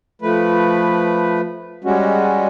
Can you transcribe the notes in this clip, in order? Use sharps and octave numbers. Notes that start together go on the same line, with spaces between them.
F3 A3 B4
G3 G#3 C#4 F#4